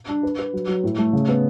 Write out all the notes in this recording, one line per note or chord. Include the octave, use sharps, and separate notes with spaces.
D4
B4
B4
F#3
F#3
A2
A3
C#3
B3